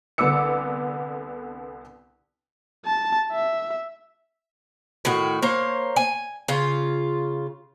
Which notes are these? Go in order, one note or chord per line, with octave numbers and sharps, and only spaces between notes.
C2 D3 B3 D6 E6 C#7
A5
E5
A2 D#3 F#4
A#3 C5 C#5
G#5
C#3 F4